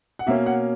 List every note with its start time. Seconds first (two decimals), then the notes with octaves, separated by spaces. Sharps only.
0.19 F#5
0.27 B2 A#3 C#4 E5
0.46 F#5